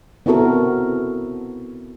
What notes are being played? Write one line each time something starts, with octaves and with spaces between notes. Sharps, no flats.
B3 C4 E4 F#4 A4 A#4